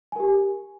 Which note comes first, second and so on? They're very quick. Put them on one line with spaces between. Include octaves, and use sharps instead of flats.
G#5 A#4 G4